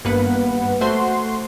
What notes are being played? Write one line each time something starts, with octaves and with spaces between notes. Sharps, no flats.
G#1 G2 A#3 B3 B4 F#5
A3 F#4 C5 C6